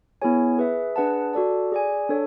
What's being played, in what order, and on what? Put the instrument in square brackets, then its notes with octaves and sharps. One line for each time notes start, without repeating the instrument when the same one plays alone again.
[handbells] B3 E4 G#4 C#5 G#5
G#4 B4 E5
D4 G#4 B4 F#5 A5
F#4 A4 D5 A5
G#4 D5 G#5
D4 A4 C#5